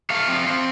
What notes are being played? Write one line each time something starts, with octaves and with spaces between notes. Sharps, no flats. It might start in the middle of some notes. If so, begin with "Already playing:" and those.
A3 F5
C4
C4